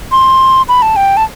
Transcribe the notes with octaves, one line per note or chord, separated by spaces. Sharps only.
C6
B5
A5
G5
A5